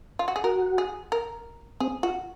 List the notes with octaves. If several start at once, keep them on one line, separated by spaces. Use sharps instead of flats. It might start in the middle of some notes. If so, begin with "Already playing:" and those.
F4
F#4
G#4
F#4 A#4
G#4
A#4
C4 G#4
F4 F#4